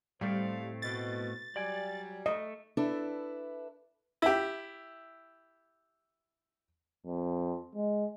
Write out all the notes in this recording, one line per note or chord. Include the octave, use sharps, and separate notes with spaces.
A2 G3 A3 C4 C5 F5
B2 A6
F#3 G3 D5 G5 G#5
A3 D#5
D4 E4 A4 B4
E4 G4
F2
G#3